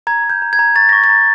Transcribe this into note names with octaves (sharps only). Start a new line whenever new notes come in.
A#5 G#6
A#5
G6
A#5
G#6
A#5
C#6 A6
C#6 A#6
A6
A#5